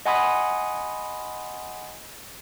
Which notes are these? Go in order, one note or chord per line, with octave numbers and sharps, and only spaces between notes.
D#5 F#5 G#5 B5 C6 D#6